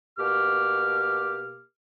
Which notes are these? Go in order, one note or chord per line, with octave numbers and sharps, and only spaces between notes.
B2 A#3 G4 D6 F6